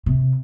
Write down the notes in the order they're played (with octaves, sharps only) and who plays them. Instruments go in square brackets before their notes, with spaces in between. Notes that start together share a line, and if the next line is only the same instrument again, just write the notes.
[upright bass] C3